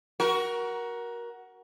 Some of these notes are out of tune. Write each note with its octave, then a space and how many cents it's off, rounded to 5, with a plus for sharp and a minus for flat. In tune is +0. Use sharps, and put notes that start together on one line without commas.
F#4 +10 A#4 +20